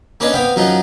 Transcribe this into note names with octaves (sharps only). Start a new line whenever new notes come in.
A#3 C#4 D4 B4 D#5
B3 C4 F5 G5
F#2 F3 D#4 F4 F#5